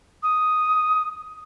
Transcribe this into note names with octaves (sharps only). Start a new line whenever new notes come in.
D#6